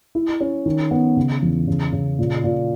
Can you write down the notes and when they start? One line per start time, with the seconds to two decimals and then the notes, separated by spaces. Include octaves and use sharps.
0.15 E4
0.41 C#4
0.66 D#3
0.91 B3
1.17 C#3
1.42 E2
1.68 C#3
1.93 C#3
2.19 A#2
2.44 A#2